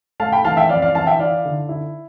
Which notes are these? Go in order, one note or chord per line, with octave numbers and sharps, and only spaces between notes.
A3 F5 A5
G5 B5
E3 F5 A5
E5 G5
F2 D5 F5
D5 F5
E3 F5 A5
E5 G5
E4 D5 F5
D3
E4